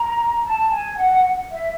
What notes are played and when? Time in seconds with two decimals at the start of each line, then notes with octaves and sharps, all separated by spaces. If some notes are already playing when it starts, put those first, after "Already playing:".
Already playing: A#5
0.44 A5
0.70 G#5
0.97 F#5
1.51 E5